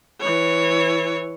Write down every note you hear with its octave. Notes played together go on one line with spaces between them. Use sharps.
E3 C#5